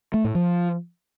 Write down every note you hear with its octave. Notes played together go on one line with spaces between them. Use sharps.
A3
A2
F3